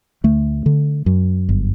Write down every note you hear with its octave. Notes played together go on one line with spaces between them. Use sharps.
D2 A3
D3
F#2
G1